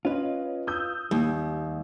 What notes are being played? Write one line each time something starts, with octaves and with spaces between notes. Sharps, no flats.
C#4 F4 B4 C#5 D#5
D#6 E6 G6
D#2 G3